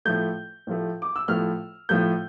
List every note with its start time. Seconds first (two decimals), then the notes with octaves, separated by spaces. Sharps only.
0.05 A2 F3 A3 G6
0.67 A2 F3 A3
1.02 D6
1.16 E6
1.28 A2 F3 A3 F6
1.89 A2 F3 A3 G6